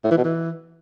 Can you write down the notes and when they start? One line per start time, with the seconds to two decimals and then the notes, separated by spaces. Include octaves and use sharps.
0.04 A2
0.11 E3
0.17 B2
0.24 E3